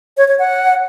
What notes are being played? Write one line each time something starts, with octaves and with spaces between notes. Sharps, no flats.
C#5
C#5
F#5